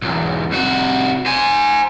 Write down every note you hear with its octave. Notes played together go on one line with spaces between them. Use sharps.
B1 E2
C2 F#4
C5 G#5